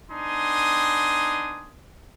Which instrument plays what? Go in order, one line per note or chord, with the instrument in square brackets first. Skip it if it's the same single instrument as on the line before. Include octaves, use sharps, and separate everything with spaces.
[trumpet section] B3 D4 D#4 G#5 C6 D#6